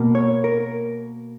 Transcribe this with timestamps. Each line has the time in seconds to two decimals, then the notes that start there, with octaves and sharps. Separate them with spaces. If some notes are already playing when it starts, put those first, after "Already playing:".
Already playing: B2 A#3
0.15 C#5
0.44 A#4